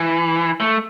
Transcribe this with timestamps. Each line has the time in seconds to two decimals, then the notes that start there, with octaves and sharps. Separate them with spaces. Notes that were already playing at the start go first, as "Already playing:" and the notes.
Already playing: E3
0.60 A3